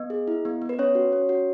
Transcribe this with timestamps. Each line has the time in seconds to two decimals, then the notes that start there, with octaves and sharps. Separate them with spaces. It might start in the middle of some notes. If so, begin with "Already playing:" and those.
Already playing: B3 D#5
0.10 G#4
0.28 E4
0.45 B3
0.62 B3
0.69 B4
0.79 C#4 C#5
0.95 F#4
1.12 C#4
1.29 F#4